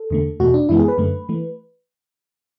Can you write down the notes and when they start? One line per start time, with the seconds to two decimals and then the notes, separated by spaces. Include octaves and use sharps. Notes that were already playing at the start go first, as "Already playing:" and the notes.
Already playing: A4
0.10 E2 D3 A3
0.40 E2 B2 A3 F#4
0.54 D4
0.69 F#2 E3 G#3 B3 E4
0.79 G#4
0.88 B4
0.98 F#2 D3 A3
1.29 E3 A3